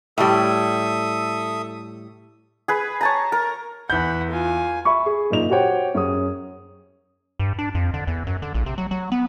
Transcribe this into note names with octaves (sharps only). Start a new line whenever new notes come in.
A2 G3 A4 E5 D#6
G#4 B4
C#5 A5 A#5
A#4
E2 F#5 B5 G6
F4 G#5
E5 B5 C#6
G#4
F#1 A#2 D#4 F7
F#4 G4 C5 C#5 F#5 G5
F#2 C#4 G#4 D#6
G2
D4
F2
D3
E2
F#2
D3
A#1
C3
F#3
F#3
B3